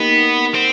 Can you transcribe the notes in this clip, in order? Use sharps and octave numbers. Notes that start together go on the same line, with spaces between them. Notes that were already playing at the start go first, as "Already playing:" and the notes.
Already playing: A#3 B3 D#4 G4
C4